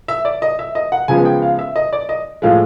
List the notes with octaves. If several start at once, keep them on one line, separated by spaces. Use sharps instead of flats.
E5
D5
D#5
E5
D#5
F#5
C#3 F3 G#3 B3 G#5
G5
F5
E5
D#5
D5
D#5
A2 F3 G#3 F5